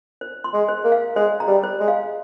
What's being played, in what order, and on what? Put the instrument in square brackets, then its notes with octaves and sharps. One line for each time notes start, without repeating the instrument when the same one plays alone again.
[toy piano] C5
C6
[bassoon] G#3
[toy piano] C5
[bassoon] A#3
[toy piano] F5
[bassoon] G#3 [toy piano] C5
[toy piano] A#5
[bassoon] G3
[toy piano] C5
[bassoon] G#3
[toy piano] F5